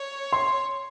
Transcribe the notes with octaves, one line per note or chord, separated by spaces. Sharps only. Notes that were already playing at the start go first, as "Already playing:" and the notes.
Already playing: C#5
C6